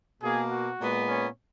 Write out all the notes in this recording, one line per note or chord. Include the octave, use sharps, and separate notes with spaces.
B2 A#3 G#4
F#4
A#2 G#3 B3
C#4